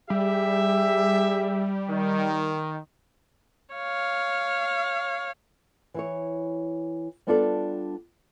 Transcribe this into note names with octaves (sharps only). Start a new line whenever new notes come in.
G3 G4 G#4 E5
D#3
C#5 F5
E3 E4 C#5
G3 B3 D4 F4 A4 D5